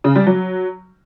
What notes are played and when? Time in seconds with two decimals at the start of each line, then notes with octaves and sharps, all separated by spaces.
0.04 C#3
0.15 G3
0.26 F#3